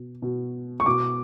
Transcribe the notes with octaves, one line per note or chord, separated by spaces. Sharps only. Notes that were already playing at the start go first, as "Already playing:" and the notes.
Already playing: B2
B2
C#6
B2 D6